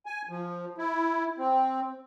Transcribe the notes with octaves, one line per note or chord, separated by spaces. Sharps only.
G#5
F3
E4
C4